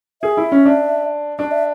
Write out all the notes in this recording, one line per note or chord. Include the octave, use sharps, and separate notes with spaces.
G#4 E5
E4
C#4
D4
D4 D5
E5